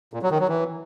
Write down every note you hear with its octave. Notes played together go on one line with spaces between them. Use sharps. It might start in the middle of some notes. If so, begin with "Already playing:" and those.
A#2
F#3
D#3
F#3
E3